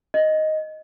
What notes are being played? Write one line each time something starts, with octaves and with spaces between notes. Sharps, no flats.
D#5